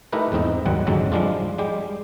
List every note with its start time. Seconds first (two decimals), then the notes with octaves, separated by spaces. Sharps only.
0.12 A3 D#4 E4 G4 A#4 B4
0.32 E2 G#2 C4 D#4 D#5
0.65 G#1 D#2 D#3 F#3 G3 F#5
0.87 F2 G#2 D3 F#3 G#3 C4
1.12 F3 G3 G#3 D4 F4
1.58 G3 G#3 G4